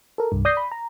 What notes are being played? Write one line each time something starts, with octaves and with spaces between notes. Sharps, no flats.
A4 A#4
C2 G2
D5 D#6 G6 A#6 C7
B5
A#5